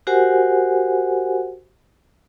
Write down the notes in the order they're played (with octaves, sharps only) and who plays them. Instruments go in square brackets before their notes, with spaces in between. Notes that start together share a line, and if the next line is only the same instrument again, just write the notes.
[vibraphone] F#4 G4 A#4 C5 F#5 G#5